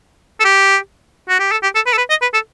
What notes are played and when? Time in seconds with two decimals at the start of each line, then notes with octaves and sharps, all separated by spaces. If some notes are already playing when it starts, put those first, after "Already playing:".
0.40 A4
0.45 G4
1.29 F#4
1.39 G4
1.52 A4
1.63 G4
1.75 A4
1.86 B4
1.93 A4
1.98 B4
2.10 D#5
2.22 B4
2.34 A4